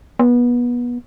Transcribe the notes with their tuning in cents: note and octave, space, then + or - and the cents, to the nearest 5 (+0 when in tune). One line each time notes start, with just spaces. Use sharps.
B3 -25